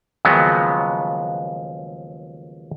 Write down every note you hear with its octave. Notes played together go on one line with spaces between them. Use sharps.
D#2 C#3 F3 F#3 G#3 B3